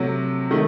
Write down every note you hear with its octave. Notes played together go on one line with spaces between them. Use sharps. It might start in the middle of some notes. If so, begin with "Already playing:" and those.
Already playing: C3 F#3 A3
D#3 A3